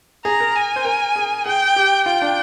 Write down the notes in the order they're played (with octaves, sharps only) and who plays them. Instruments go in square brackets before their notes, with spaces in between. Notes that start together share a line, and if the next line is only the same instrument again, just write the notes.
[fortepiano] G#4 [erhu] A#5
[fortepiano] A#4
[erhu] G#5
[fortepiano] C5
A#4
G#4
[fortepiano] G#4 [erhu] G5
[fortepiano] G4
[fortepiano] F4 [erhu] G5
[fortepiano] D4